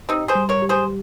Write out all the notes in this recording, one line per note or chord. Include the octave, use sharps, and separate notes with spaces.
C4 D#4 G4
G#4 C5
G3
A#4 C#5
G4
G#4 C5